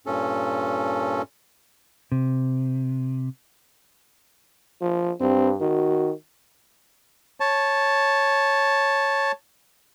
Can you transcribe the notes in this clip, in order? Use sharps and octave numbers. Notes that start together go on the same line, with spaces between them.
G2 A#2 C#4 A4
C3
F3
G2 C4
D#3 F#4
C#5 A5